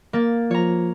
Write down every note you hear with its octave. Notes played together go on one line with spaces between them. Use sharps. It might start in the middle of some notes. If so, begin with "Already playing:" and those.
A#3 A6
F3 C#5 A#5